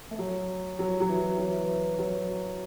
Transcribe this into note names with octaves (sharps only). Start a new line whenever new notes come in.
A3
F#3
F#3
F#3
E3
F#3
E3
E3
F#3